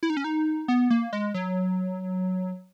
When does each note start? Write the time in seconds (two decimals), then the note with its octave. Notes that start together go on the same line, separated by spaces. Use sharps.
0.03 E4
0.10 D#4
0.17 C#4
0.24 D#4
0.68 B3
0.90 A#3
1.13 G#3
1.34 F#3